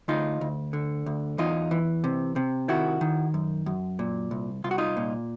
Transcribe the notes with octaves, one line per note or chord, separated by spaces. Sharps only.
D2 D#4 F4
D2
D3
D2
E2 D#4 F4
E3
C3
C3
D#3 E4 F#4
D#3
F#2
F#2
A#2
C2
C2 F4
F#4
D#4 F4
A#2